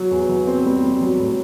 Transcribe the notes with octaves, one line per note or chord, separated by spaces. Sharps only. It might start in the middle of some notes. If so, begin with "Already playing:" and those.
Already playing: F#3
E2
F#3
C4
G3
G3
F#3
A2